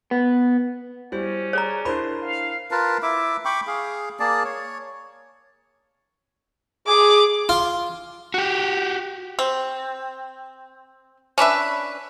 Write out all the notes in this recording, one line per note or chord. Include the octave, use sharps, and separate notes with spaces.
B3
G3 C#4 E4 C5
G#4 C#5 D5 A#5
D4 E4 A#4 C5 B5
F5
F4 A#4 B4 A5
E4 E5 D6
G5 B5 C#6 D6
G#4 F5
A#3 G#4 D5 A5
C#5
G#4 D6
F4
F#4 G4
C4
C#4 D4 B4 E5